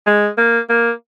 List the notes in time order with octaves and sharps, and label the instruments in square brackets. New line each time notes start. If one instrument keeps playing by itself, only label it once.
[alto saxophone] G#3
A#3
A#3